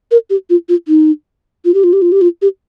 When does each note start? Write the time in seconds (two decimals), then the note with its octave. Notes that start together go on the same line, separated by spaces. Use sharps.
0.11 A#4
0.30 G4
0.50 F4
0.69 F4
0.88 D#4
1.65 F4
1.74 G4
1.84 F4
1.93 G4
2.02 F4
2.12 G4
2.21 F4
2.42 G4